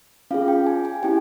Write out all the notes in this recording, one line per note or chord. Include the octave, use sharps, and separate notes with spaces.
C#4 F4 G#4 F5
G5
G#5
G#5
C#4 E4 G4 G5